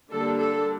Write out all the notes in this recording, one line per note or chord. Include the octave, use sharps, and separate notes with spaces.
D3 G3 A#3 D4 A4
A4